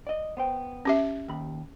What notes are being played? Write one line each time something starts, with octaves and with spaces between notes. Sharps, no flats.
D5 D#5
B3 C5 G5
C#4 G4 E5
D#2 B5